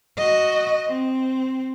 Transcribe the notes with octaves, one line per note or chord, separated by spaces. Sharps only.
F#4 D#5
C4